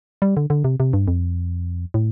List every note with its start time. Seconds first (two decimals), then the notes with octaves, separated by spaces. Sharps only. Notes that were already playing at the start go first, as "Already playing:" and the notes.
0.22 G3
0.37 D3
0.50 D3
0.64 C3
0.80 C3
0.93 G2
1.08 F2
1.94 A2